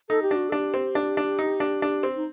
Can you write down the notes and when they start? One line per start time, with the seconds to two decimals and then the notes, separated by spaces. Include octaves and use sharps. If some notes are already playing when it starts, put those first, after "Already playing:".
0.09 D#4 A4
0.22 G4
0.31 D4 F#4
0.49 A4
0.52 D4 G4
0.74 C4
0.95 D4
1.17 D4
1.39 D#4
1.60 D4
1.82 D4
2.03 C4
2.16 D#4